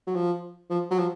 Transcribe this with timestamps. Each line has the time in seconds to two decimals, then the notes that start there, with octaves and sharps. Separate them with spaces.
0.07 F#3
0.15 F3
0.70 F3
0.91 F#3
0.99 F3